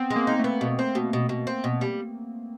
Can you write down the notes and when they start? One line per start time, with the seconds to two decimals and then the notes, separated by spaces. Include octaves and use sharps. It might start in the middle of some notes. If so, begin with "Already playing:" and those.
Already playing: B3 C4
0.10 G#3
0.16 A#3
0.27 D#4
0.39 A3 B3
0.61 B2
0.79 C4
0.95 B2
1.13 B2
1.29 B2
1.47 C4
1.64 B2
1.81 G3